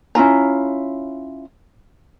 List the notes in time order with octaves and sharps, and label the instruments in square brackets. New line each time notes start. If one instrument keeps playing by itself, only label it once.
[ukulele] C#4 E4 F4 A#5